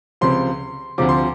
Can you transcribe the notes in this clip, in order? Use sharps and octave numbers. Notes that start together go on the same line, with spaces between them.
C#2 C3 F3 C6
D2 C3 F3 D6
C6